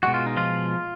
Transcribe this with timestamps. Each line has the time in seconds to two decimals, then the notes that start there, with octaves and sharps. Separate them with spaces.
0.03 B2 G#3 F#4
0.14 F4
0.26 D#4
0.37 F3 F4